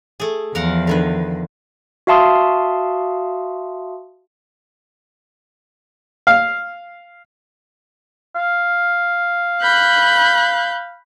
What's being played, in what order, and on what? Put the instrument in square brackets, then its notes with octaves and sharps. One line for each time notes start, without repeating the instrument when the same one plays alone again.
[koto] A3 G#4
[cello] E2 F3 [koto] A#4 F5 F#5
[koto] D3 D#3 B4
[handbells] F#4 E5 F5 A5 C6 D#6
[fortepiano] F5
[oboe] F5
[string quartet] B5 F#6 G6